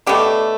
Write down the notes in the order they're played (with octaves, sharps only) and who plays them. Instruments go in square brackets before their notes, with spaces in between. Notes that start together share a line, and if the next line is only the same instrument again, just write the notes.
[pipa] B2 A3 D4 G4